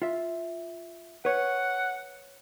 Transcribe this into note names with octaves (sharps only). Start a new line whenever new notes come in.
F4 E5
B4 C#5 F#5